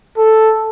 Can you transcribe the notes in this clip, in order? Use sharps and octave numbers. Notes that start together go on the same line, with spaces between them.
A4